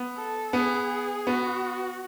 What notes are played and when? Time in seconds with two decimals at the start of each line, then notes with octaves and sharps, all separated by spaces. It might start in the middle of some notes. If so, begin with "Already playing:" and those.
Already playing: B3
0.17 A4
0.53 B3 G#4
1.27 B3 F#4